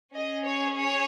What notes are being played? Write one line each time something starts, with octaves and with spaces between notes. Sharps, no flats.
C#4 G#4 D#5
C#5
C#5